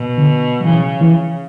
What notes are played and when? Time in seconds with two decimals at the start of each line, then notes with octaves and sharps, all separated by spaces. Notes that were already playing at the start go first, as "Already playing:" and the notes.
Already playing: B2
0.18 D3
0.60 F#3
0.65 C#3 E3
1.01 E3